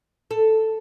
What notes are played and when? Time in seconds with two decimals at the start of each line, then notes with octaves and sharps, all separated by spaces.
0.31 A4